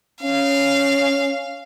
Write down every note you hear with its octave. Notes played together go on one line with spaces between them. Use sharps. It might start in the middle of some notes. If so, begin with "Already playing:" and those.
C#4 F5